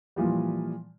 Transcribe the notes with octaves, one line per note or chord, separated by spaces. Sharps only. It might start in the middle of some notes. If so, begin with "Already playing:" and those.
A#2 E3 F3 G3